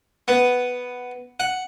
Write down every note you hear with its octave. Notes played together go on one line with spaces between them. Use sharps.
B3
F#5